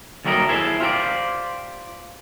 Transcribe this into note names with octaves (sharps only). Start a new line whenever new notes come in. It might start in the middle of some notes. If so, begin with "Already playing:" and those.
D#2 F#3 G3 A3 A#4 D#5
E4 G#4 A4 C5 E5
F4 G4 C5 D5